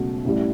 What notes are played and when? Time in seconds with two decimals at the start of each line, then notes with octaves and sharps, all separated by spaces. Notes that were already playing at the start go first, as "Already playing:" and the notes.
Already playing: C#2 B2 F#3 A3
0.25 A1 A2 G3